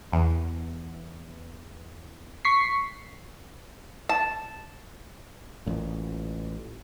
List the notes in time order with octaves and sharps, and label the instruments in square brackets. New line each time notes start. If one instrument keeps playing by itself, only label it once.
[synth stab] E2
[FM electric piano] C#6 B6 C7
[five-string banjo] A5
[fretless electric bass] A1 A#2